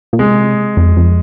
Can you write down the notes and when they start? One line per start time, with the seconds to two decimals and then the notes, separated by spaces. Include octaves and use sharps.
0.13 A#2
0.19 C3 G#3
0.77 F2
0.97 F2